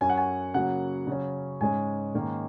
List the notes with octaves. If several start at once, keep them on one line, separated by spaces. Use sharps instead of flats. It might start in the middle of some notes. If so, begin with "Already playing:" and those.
F#2 F#3 C#4 G#5
F#5
G#5
C#3 F#3 A#3 F#5
C#3 F#3 C#4
G#2 G#3 C#4 G#5
G#2 D#3 A#3 C#4